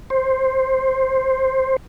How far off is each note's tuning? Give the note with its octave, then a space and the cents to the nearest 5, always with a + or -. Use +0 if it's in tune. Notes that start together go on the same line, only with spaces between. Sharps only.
C5 +10